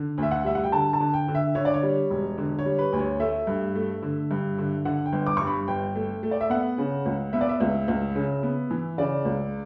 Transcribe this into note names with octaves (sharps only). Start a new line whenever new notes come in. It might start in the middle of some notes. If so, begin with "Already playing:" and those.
Already playing: D3
D2 E5
F#5
G3 E5
F#5
G5
D3 A5
A5
D3
G5
D3
E5
D3 C#5
D5
C#5
G3
E1
D3
C#5
G3
B4
D2
C#5
A3 E5
G2
A3
D3
G2
D3
D3 F#5
G5
G1
D6
G2 C#6
B5
G1 G5
A3
A3
D5
E5
B3 F#5
C#3
C#2
B3 E5
D5
E5
C#2
C#2
C#3
B3
E3
C#3 D5
C#2